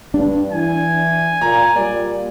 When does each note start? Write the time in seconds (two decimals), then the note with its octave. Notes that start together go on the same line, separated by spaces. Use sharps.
0.14 G2 D4
0.52 E3 G#5
1.41 A#2 A#5
1.76 A#2 G3 D5